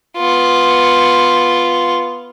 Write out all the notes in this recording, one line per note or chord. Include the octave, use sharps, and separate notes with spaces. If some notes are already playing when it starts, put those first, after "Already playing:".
B3 F4